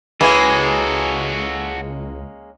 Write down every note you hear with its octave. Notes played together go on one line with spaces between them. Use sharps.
C#2 E3 G#3 A#3 C#4 F#4 A4